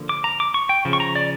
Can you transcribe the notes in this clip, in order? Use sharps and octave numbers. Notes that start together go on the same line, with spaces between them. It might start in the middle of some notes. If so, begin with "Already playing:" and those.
Already playing: D3 F3 A#3
D6
A#5
D6
C#6
G5
C#3 F3
C#6
A#5
D5